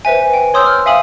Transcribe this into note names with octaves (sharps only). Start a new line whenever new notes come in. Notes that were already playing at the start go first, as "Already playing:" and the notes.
B4 C5 E5 G#5
G5
C#5 C6 D#6 E6 G6
F6
E5 F5 G#5 D#6 F#7